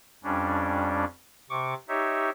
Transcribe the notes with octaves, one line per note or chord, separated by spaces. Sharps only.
F2 G3 C#4 D4
C3 C#6 D6
D#4 G4 C#5 E5